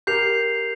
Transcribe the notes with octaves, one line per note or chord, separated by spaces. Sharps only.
G4 A#4 G6 C7 F7